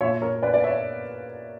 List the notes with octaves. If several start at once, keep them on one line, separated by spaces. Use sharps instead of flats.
A#2 C#5 E5
A#4 C#5
B4 D5
D5
C#5 E5